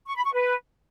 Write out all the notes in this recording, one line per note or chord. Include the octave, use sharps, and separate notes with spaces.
C#6
B5
C#6
B4